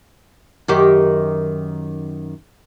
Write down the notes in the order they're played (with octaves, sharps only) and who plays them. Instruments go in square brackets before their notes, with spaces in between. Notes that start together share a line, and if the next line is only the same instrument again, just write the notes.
[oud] F#2 D#3 G4